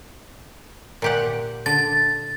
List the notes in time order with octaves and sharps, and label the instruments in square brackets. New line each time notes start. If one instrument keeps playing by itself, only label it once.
[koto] A#2 G4 F#5
[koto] D3 [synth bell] A6